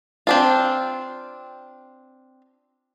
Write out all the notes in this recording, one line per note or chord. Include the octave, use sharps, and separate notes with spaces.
C4 D4 F4